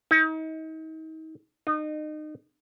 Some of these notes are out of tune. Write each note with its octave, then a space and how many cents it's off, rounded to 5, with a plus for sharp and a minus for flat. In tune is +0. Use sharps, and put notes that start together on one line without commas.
D#4 +35
D#4 -30